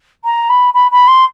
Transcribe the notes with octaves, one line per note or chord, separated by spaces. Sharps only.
A#5
B5
B5
B5
C6